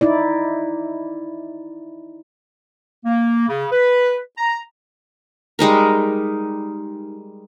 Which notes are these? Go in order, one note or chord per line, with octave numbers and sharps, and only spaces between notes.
D#4 E4 D5
A#3
C#3
B4
A#5
G3 G#3 D#4 A#4